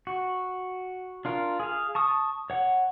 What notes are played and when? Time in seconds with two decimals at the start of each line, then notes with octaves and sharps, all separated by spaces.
0.07 F#4
1.25 D4 F4 A#4
1.60 G#4 F5
1.95 A5 C#6 D#6
2.50 C#5 F#5